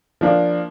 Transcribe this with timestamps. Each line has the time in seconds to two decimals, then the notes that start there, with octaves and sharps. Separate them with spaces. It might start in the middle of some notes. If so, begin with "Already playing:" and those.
0.21 F3 A#3 D4